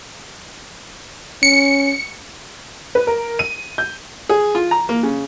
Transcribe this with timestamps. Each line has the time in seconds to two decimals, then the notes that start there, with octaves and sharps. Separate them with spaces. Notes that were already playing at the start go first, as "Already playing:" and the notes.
1.43 C#4 C#7
2.95 B4
3.07 A#4
3.39 D#7
3.78 G6
4.29 G#4
4.55 F4
4.71 A#5
4.89 A#3
5.03 C#3